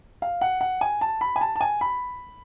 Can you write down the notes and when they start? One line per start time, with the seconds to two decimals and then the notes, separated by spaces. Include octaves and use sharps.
0.22 F5
0.41 F#5
0.61 F#5
0.81 G#5
1.01 A5
1.21 B5
1.36 G#5
1.41 A5
1.56 A5
1.61 G#5
1.81 B5